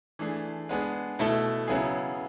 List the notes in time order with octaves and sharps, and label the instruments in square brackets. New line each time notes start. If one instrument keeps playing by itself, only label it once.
[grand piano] E3 A3 D4 G#4
G#3 B3 D4 G#4
B2 A3 E4 A4
C#3 F#3 B3 E4 G#4